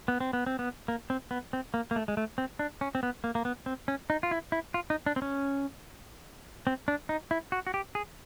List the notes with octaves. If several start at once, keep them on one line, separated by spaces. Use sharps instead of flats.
B3
C4
B3
C4
B3
A#3
C4
B3
C4
A#3
A#3
A3
G#3
A3
C4
D4
C#4
C4
B3
A#3
A#3
B3
C4
C#4
D#4
F4
E4
E4
F4
D#4
D4
C4
C#4
C4
D4
D#4
E4
F#4
F#4
G4
G#4